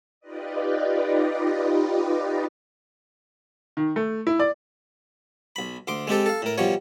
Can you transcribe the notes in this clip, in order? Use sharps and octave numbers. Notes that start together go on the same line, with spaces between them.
D#4 F4 G4 B4 D5 D#5
D#3
A3
E4
D5
B1 B5
D2 C6 D6
G#3 C4 G4 A4
A4 F5
A2 A#4
B2 F3 G3 C#5